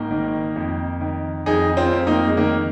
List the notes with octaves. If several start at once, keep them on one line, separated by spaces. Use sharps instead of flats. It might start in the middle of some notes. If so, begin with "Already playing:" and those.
Already playing: G#1 A#3 D#4
D#3
F2
D#3
F2 D#4 G#4
C4 F4
F2
A#3 D#4
G#3
D#3 A#3